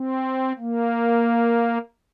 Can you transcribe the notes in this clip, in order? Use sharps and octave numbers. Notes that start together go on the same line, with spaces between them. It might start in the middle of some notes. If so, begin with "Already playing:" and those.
Already playing: C4
A#3